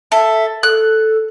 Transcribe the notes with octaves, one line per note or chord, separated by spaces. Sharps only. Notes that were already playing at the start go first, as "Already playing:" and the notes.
A4 E5
A4 F#6